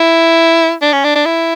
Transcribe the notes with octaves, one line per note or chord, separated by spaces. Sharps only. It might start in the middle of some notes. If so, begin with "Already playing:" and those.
Already playing: E4
D4
C#4
D4
D4
E4